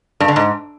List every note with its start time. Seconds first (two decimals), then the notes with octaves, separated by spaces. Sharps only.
0.20 G2
0.28 D3
0.36 G#2